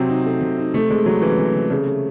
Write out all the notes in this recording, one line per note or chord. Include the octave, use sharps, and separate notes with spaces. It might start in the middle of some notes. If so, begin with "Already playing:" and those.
Already playing: C3 F#3 C4
D#4
A3
C3
D#4
C3 A3
C3 G#3
C3 F#3
E3 C#4
C3
C3
C#3 A3
A3